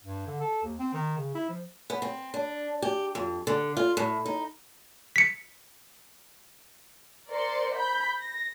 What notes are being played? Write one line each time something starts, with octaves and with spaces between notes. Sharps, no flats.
G2
D3
A4
D#2
C4
D#3
C#3
E4
F3
B3
C4
D4
G4
F2
D3
F4
A2
D#4
B6 C#7
A#4 C5 D5 C6 C#7
B5 G6 B6
A#6